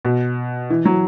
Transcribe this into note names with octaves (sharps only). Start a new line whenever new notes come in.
B2
E3
F#3